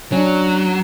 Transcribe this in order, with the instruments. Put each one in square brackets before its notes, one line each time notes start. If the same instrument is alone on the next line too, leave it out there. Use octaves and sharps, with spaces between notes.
[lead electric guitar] F#3 [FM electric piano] C#4 D4